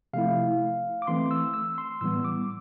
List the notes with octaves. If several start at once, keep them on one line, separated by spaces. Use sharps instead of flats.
C3 F3 A3 E4 F5
D6
E3 A3 C4 C6
E6
E6
C6
A2 E3 G3 B3 E6
D6